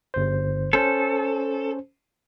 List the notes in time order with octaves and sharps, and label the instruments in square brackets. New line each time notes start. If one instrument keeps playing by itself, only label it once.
[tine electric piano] G1 C5
[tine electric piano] C#4 C5 [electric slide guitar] A4